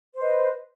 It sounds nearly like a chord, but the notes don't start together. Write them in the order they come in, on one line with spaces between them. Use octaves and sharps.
C5 B4 D#5